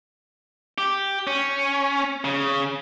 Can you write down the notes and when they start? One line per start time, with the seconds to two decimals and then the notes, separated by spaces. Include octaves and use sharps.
0.78 G4
1.27 C#4
2.24 C#3